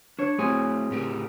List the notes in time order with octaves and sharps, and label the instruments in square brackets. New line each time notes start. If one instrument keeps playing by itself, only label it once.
[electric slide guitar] D4 [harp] C#5
[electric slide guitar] A3 E4 F#4 [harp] C4 G#4
[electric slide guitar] A2 G4 A#4